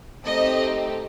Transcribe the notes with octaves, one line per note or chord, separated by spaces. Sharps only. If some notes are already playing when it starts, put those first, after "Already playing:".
A3 C4 D#4 G4 D#5